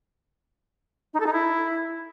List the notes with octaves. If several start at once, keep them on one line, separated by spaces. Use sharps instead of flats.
D#4
A4
D#4
E4